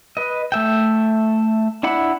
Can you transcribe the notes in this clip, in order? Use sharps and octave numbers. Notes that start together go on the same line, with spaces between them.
B4 D#5
A3 E5 G5
D4 E4 F#5 B5